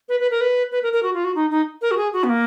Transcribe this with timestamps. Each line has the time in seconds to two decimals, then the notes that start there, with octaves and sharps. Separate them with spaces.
0.09 B4
0.20 B4
0.31 A#4
0.41 B4
0.72 B4
0.83 A#4
0.93 A#4
1.03 F#4
1.14 F4
1.24 F#4
1.35 D#4
1.51 D#4
1.82 A#4
1.91 F#4
1.97 G#4
2.13 F#4
2.24 B3
2.29 A#3